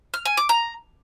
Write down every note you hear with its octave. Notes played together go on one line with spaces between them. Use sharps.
F6
G#5
D6
A#5